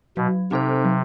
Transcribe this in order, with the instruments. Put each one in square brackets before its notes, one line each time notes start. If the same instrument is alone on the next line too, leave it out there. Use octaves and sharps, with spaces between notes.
[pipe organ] B2 [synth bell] F#3
[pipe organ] C3 [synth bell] C4 D#4 A4 C5
[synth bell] F#3